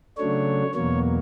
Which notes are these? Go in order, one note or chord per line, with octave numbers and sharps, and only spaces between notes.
C#3 F#3 A3 D4 C#5
E2 B2 F#3 A#3 C#5